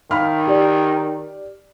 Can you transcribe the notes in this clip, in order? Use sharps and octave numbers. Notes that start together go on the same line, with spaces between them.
D#3 F5 B5 F6
G4 D5